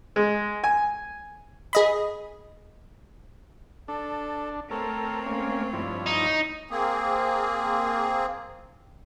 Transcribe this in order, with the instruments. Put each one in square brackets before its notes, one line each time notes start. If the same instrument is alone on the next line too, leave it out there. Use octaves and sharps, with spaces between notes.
[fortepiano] G#3
G#5
[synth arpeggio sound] G#4 D#5 B5
[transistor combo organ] D4 [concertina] A4
[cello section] A3 C4 [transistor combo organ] A4 A#4 [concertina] C#5
[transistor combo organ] A#3 C#4
G2 F3 E4
[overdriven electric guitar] D#4
[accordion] A#3 C4 G#4